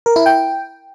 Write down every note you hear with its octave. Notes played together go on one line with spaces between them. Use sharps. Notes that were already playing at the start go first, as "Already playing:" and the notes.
A#4
E4
G5